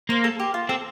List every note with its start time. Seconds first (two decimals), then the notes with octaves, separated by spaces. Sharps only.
0.09 A#3 C5
0.24 A4
0.40 G4
0.54 F4
0.69 C4 A4